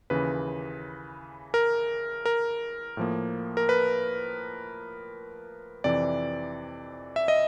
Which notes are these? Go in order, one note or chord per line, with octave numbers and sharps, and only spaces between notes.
D#2 C#3 E3 B4
A#4
A#4
A2 F3 A#3
A#4
B4
F2 C3 E3 D5
E5
D#5